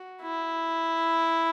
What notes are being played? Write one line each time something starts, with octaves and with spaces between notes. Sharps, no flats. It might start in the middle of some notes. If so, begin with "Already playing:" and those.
Already playing: F#4
E4